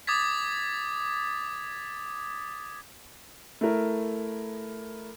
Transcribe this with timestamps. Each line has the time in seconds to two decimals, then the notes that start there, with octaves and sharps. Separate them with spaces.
0.07 D6 D#6 G#6 A6 B6
3.61 A3 E4 A#4